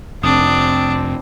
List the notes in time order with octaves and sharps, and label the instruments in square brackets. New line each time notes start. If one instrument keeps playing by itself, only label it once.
[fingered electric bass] F1 [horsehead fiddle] C4 [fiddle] D4 [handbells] D#6